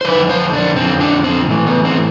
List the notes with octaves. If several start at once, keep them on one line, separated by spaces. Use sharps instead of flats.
C5
F2 D3 F3 B4
C5
D4
F2 D3 F3 C4
D4
C4
A2 E3 A3
B3
C4